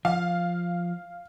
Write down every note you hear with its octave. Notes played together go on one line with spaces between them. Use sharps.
F3 F5